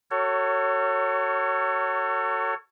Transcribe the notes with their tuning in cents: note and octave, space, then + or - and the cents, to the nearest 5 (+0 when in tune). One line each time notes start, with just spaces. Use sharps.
F#4 +20 A4 +35 C#5 +0